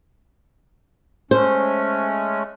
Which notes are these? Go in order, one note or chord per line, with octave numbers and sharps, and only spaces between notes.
G#3 A3 C#4 C5